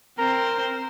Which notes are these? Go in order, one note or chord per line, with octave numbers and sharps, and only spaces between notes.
C4 A#4 C5